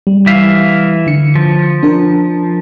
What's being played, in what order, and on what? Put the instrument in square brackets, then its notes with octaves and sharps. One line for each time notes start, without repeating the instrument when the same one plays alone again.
[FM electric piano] G3
[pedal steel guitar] E3 E5 F5
[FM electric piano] D3 C#7
[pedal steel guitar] F3
[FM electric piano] D4 A#4